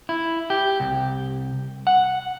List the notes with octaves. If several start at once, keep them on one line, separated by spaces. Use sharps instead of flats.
E4
G4
C2
F#5